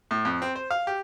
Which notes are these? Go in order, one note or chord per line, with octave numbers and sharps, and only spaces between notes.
A2
F2
C4
C5
F5
G4